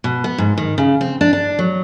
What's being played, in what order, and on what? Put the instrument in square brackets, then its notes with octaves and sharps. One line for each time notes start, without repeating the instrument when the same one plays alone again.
[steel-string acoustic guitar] B2
B3
G#2
D#3
C#3
C4
D4
D4
F#3